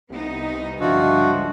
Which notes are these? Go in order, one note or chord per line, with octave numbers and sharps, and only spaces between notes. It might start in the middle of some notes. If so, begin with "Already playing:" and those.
C2 B3 D#4
C#2 G2 D3 F3 D4 F#4 D#5 E5